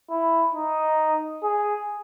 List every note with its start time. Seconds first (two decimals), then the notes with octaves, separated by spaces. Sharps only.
0.10 E4
0.54 D#4
1.43 G#4